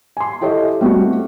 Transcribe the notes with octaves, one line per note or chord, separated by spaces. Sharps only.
G#5 C6
E4 G4 A4 C#5 D#5 E5
G3 A3 C4 F#4